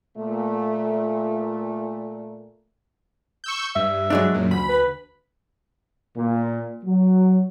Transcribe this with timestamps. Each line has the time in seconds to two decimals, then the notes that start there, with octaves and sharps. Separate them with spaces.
0.17 A#2 A3
3.44 C#6 E6 G6
3.76 G2 E5
4.10 F#3 G#3 D4
4.34 F#2 A#2
4.51 D2 B5
4.69 B4
6.16 A#2
6.85 F#3